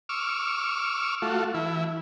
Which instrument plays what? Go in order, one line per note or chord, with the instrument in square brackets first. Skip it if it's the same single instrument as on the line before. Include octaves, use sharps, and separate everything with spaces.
[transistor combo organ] C#6 D6 E6 F6
A3 F4 F#4
E3 E4